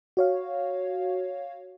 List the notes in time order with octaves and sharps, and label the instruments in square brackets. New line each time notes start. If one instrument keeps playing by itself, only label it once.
[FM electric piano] F#4 C#5 F5